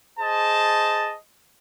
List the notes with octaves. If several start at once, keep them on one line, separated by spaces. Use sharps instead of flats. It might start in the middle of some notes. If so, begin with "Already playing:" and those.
G#4 C5 D#5 A5